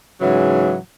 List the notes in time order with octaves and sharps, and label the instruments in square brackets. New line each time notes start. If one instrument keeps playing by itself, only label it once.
[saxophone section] G#2 C#3 E3 F#3